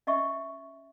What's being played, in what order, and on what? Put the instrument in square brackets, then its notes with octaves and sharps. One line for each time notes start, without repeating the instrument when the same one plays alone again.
[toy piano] C#4 D#5 E5 G5 C#6